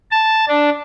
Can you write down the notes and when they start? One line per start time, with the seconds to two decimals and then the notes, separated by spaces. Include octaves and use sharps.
0.11 A5
0.48 D4